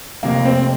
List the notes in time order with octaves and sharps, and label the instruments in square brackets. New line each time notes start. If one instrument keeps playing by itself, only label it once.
[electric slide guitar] F2 C3 [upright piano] A#3
[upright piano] C4